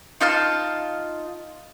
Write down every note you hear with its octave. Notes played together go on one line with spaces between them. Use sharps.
D#4 F4 A5 F6